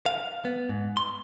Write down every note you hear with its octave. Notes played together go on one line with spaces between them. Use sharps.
F5
B3
G#2
C6